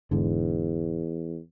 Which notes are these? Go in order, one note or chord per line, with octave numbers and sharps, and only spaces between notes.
E1 E2 G#2 D3